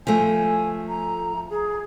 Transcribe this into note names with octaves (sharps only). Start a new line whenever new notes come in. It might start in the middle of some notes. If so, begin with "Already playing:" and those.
F3 A3 G#5
A#5
G#4